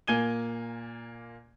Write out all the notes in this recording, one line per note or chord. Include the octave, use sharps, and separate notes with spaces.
A#2 A#3 G#5 G#6 D#7 G7